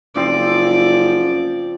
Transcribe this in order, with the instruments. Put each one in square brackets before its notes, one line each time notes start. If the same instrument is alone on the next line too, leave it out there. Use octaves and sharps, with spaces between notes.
[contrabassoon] F#1 [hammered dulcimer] F3 C4 C6 [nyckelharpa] D5